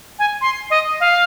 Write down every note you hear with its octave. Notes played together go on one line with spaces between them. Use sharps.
G#5
C6
D#5
F5